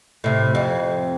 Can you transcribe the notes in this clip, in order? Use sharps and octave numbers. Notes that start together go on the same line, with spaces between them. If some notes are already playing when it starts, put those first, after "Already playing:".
A2 C3
F2